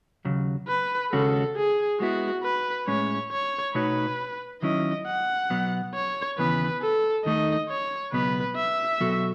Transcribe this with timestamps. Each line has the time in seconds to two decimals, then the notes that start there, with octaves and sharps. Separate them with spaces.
0.25 D#2 C#3 F#3
0.68 B4
1.12 D#2 C#3 G#3 C#4 F#4 A4
1.56 G#4
2.00 G#3 B3 E4 F#4
2.43 B4
2.87 A2 G#3 C#4 C#5
3.32 C#5
3.75 B2 A3 D#4 F#4 B4 C#5
4.62 D#3 F#3 C#4 E4 D#5
5.07 F#5
5.50 B2 F#3 B3
5.94 C#5
6.38 D#2 C#3 E3 B3 B4
6.82 A4
7.25 D#2 D#3 A3 D#4 D#5
7.69 C#5
8.12 C#2 B2 F#3 B3 B4
8.56 E5
9.00 B2 F#3 B3 F#4 A4